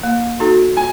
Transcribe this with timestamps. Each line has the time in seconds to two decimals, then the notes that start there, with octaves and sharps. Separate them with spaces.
0.03 A#3
0.40 D#4 F#4 A4
0.77 G#5